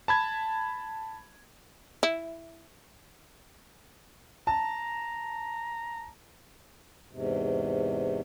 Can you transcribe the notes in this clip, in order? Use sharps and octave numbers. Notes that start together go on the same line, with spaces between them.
A5 B5 G#6
E4
A5 A#5
E2 G#2 C3